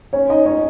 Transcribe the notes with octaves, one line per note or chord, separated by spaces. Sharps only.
C#4 C#5
D#4 D#5
C#4 C#5